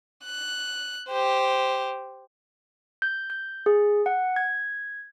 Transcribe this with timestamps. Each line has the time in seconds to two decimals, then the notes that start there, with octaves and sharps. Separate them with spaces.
0.25 F#6
1.08 G4 C5
3.02 G6
3.30 G6
3.66 G#4
4.06 F#5
4.36 G#6